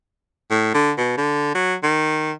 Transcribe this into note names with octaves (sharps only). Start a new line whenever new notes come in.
A2
D3
B2
D3
F#3
D#3